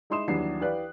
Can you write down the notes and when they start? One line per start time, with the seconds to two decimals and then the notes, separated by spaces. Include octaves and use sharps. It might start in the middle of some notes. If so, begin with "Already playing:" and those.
0.10 G#3 D#4 E4 C6 D#6 E7
0.28 D#2 E3 F#3 G3 D4 C7
0.61 E3 G4 B4 D5 F5 F#6